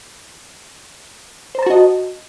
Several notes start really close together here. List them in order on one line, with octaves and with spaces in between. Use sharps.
C5 A#5 A5 F#4 D#5